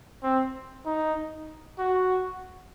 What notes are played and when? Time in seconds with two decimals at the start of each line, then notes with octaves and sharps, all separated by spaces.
0.23 C4
0.85 D#4
1.78 F#4